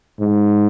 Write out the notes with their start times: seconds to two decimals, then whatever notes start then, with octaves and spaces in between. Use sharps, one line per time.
0.20 G#2